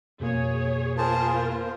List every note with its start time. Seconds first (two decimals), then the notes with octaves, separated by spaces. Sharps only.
0.20 F2 B2 A#3 G#4 C#5
0.98 B3 F4 G#4 A#4 C5 A5
1.29 C5